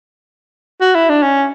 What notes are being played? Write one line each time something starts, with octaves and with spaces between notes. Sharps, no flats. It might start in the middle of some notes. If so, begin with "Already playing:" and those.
F#4
E4
D4
C#4